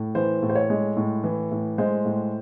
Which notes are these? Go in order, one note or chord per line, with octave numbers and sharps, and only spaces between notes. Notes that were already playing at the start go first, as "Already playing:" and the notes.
Already playing: A2
E3 C5
A2
C5
C#5
G#3
A2
E3
A2
G#3 C5
A2